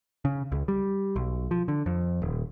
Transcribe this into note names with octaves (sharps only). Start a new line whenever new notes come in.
C#3
C#2
G3
B1
F3
D3
F2
D#1